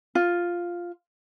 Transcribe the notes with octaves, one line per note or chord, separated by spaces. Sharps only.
F4